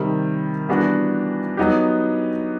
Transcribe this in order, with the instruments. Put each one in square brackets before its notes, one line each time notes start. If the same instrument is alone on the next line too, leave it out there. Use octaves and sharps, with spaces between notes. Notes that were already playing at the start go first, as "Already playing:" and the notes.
Already playing: [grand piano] C3 D#3 G3
E3 G3 B3 D4 F#4
F#3 B3 D#4 G4